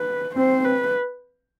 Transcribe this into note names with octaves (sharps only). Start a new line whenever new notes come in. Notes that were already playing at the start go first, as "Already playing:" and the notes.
Already playing: B4
C4 C5
B4